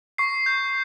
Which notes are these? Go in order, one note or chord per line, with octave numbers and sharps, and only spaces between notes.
C#6 C7
G6